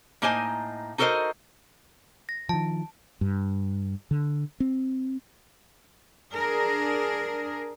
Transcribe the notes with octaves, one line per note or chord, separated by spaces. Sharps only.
A2 A#3 D#4 C5 D#5 G#5
D#4 F#4 A4 A#4 C5 D#5
A#6
D#3 F3 A5
G2
D3
C4
D4 G#4 A#4